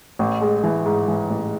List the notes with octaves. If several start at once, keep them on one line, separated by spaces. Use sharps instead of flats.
A1
G#3
E3
G#2
E3
A1